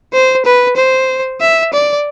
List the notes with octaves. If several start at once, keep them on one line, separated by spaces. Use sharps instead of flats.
C5
B4
C5
E5
D5